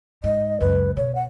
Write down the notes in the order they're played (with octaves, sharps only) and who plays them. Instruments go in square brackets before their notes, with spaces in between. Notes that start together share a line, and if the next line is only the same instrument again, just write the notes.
[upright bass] G#2 [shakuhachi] D#5
[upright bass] C#2 F#2 [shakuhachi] B4
[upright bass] B2 [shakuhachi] C#5
[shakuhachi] F#5